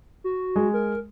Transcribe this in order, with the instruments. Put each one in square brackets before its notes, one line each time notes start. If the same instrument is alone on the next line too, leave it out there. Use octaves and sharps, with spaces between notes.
[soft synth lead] F#4
[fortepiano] G#3
[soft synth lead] A#4